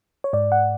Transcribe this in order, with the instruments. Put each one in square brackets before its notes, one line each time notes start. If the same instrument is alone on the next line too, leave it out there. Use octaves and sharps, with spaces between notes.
[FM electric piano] C#5
G#2 D5
F#5